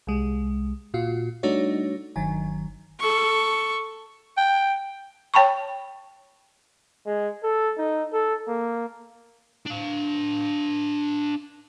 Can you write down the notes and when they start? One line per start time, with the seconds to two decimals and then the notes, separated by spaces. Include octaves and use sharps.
0.07 C2 G#3
0.94 A#2 F4 F#4
1.43 G3 A3 D4 D#4 F#4 C#5
2.16 G1 D#3 F#3 G#5
2.99 A4 C#6
4.37 G5
5.34 C#5 G5 A5 B5 C#6
7.07 G#3
7.43 A4
7.78 D#4
8.13 A4
8.48 A#3
9.66 D4 F5